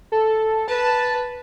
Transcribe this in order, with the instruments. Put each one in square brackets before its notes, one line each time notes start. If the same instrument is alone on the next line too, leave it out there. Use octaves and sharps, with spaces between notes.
[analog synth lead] A4
[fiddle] B4 [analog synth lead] A5